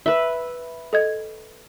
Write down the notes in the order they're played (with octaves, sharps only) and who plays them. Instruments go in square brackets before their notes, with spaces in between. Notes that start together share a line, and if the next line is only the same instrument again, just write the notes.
[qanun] B4 E5
[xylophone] A4 D#5 G#6